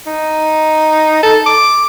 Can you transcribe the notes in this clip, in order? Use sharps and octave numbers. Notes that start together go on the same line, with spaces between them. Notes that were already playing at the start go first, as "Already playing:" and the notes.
D#4
A4
D6